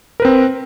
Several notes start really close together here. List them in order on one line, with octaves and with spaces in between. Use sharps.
A#4 B4 C4